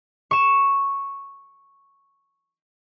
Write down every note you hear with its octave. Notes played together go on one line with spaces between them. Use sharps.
C#6 E7